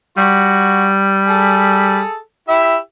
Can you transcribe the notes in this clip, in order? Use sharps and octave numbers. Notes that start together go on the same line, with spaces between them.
G3 F#4
G#4 A4
E4 G4 E5